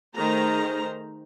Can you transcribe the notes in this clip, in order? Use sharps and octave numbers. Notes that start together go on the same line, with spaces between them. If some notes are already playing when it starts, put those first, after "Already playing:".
D#3 A3 G#4 C5 A#5